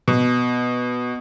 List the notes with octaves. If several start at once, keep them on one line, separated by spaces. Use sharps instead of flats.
B2